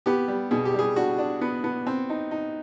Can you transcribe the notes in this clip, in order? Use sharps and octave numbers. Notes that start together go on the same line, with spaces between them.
B3 G4
G3
B2 G#4
G4
G3 G#4
D4 F#4
D4
B3
B3
C4
D#4
D#4